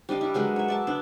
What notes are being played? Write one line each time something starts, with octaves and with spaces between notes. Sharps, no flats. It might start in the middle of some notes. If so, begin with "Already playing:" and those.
G3 D4 D#5 F5
E4 A#4
F#3 G#3 A#4 B4
C#5 E5
D5 E5 A5
B3 D4